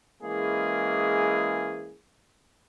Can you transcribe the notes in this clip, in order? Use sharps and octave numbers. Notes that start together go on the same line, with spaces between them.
E3 G#3 A#3 C#4 E4 G#4